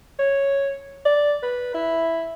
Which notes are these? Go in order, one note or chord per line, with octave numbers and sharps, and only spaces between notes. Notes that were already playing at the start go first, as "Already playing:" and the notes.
C#5
D5
B4
E4